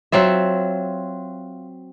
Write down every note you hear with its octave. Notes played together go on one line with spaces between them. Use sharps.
F#3 C4 F4 E5